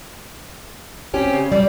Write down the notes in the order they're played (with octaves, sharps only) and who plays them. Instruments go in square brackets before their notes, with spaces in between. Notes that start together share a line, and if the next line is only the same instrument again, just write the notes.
[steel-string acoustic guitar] C4 C#4 G4
[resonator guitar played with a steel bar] C#3
[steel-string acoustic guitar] G3 [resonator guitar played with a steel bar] D5